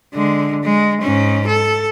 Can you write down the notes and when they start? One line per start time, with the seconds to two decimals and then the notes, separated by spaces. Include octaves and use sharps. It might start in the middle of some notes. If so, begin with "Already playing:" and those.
0.14 D3 G#3
0.63 G#3
1.01 G#2 C#4
1.48 A4